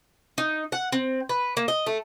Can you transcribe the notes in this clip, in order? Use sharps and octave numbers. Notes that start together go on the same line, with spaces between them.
D#4
F#5
C4
B4
A#3
D#5
A3